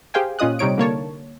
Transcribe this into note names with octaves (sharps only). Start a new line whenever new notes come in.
G4 G#4 C5 F5 G5 G#5
A#2 C#4 F4 D#5 D#6 F#6
C3 G3 D#4 C#5 D7
D3 A#3 C#5 A5